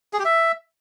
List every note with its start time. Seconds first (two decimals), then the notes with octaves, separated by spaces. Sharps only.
0.13 G#4
0.19 G4
0.25 E5